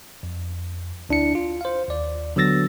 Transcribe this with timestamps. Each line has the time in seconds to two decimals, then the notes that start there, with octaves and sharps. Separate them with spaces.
0.23 F2
1.09 D2 D4 E4 C#7
1.35 F4
1.61 C5 F5
1.88 D#2 D5
2.36 D3 F#3 B3 E6 A6 A#6